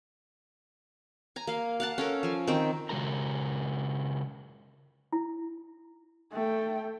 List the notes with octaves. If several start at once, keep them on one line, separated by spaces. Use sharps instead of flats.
G#5 A#5
A#3 F5
F5 F#5 A5
C#4 A4 A#4
F3 G#5
D#3 C4
C#3 G#3 F#4 A#4 A#5
E4
A3 G5